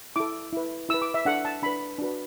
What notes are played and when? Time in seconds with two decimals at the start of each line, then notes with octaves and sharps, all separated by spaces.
0.16 E4 A4 D6
0.53 E4 B4
0.89 E4 E6
0.94 B4
1.02 D6
1.14 E5
1.25 D4 A4 F#5
1.45 A5
1.63 D4 B4 B5
1.99 D4 F#4 B4